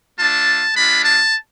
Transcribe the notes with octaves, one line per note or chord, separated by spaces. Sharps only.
A3 D4 F4 A5
G#3 D4 F4 B5
A5